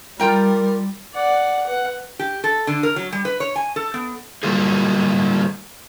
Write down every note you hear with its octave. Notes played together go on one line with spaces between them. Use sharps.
G3 F4 A#4 G5 A#5
D5 F#5
B4 F#5
G4
A4
D3
A#4
F#3
G3
B4
C#5
G#5
A4
B3
D3 F#3 G3 A#3 F4 G#4